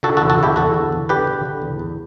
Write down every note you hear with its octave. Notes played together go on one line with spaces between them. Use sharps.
D3 F#4 A4
F#4 A4
E2
F#4 A4
D3 E4 G4
E2 F#4 A4
D3
E2
D3 G4 B4
D3
D3
E2
E2